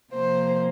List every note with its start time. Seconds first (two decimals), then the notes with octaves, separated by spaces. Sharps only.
0.13 C3 F3 A#3 C5